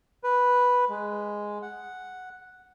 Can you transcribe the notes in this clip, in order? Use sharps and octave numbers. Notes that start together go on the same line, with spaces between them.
B4
G#3
F#5